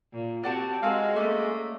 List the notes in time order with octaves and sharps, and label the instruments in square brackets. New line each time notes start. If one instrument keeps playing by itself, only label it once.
[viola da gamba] A#2
[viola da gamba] C4 F#4 G4 [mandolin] D5 F#5 A5
[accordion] G#3 [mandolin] C4 G#4 A#4 [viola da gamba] F#4 [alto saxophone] F5
[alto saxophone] A3 [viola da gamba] A#3 [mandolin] C#4 D5